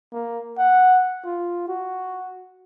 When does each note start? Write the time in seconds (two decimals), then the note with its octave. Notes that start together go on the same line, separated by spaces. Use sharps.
0.13 A#3
0.58 F#5
1.25 F4
1.68 F#4